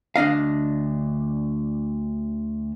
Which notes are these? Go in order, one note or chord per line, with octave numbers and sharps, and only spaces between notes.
D2 D4 D#5 F5